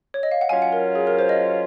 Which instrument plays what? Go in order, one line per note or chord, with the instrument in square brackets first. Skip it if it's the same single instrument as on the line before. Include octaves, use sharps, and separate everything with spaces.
[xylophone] C#5
D#5
F5
F#5
[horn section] F#3 C#4 F4 [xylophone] F5 G#5
[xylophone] F#5
A#4
G#4
A#4
C5
D#5